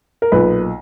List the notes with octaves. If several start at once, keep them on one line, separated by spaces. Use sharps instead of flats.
A#4
B1 A#2 B4